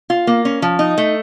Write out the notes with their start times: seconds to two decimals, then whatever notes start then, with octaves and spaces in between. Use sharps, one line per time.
0.10 F4
0.27 A#3
0.45 C#4
0.62 F3
0.79 D#4
0.98 A3